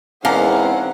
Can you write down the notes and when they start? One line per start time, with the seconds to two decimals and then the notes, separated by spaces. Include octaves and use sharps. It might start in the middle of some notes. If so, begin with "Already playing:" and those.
0.25 E2 G#2 B2 A#3 C4 C#4 F5 F#5